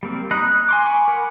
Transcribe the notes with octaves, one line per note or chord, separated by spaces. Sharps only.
G3 A#3 C4
D#4 D#5 B5 F#6
F#6
G#5 C6 D6
G#5 B5 C#6 D6
A#4 F#5 B5